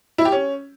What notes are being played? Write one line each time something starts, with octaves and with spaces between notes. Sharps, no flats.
E4
G4
C#4